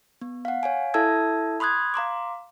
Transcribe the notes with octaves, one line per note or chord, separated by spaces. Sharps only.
B3
F5 F#5
C#5 F5 G#5
E4 A4 E5 A5 E6 G#6
B5 C6 D#6 F#6 G#6
F5 A#5 C6 D6